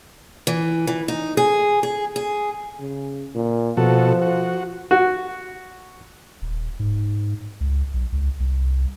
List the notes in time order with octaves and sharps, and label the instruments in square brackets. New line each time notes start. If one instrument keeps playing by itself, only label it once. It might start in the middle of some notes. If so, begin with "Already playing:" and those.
[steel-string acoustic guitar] E3
E3
D#4
G#4
G#4
G#4
[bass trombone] C#3
A#2
[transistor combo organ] B2 F#4 A4 [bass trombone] F3
[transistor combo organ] F#4
[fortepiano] F#4
[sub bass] D#1
G#2
C#2
B1
C#2
C2